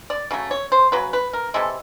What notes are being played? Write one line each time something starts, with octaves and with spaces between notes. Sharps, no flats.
D5
C#3 F#3 A3
C#5
C5
C#3 F#3 B4
B4
A#4
C3 E3 G#3 A4